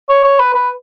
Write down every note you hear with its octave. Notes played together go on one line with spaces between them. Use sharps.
C#5
C#5
B4
B4